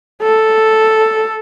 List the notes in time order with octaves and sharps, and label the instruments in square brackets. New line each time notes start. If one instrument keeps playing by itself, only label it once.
[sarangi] A4